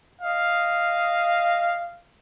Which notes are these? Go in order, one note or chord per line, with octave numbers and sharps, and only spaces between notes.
D#5 F5